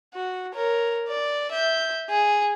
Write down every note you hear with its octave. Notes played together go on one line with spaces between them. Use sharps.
F#4
A#4 C#5
D5
E5 G6
G#4